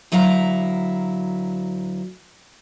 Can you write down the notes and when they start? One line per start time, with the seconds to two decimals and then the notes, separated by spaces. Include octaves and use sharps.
0.12 D2 F#3 E4 F5 A#5